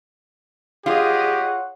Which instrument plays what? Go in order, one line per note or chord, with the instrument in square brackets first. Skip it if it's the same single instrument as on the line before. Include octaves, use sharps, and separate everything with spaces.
[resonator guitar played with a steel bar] F4 [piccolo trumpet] G4 [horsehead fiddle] G#4 D#5 [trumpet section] C#5 F#5